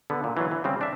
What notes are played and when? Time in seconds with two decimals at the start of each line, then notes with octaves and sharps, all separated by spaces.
0.10 D3 B3
0.24 A#2
0.37 E3 F#3 F4
0.51 E3
0.64 C#3 G3 C4
0.81 D4 E5